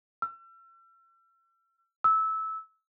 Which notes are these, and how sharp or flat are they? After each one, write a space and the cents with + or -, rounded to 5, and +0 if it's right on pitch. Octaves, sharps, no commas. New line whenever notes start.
E6 +40
E6 -15